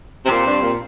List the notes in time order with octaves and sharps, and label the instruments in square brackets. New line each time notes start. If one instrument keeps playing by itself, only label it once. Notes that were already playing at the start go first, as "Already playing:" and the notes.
[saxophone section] C3
[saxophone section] A#2 [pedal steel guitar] C4 G4 C5
[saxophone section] G2
A#2